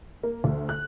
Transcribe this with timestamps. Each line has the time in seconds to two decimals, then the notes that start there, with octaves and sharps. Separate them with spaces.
0.23 A#3
0.44 D2
0.69 F#6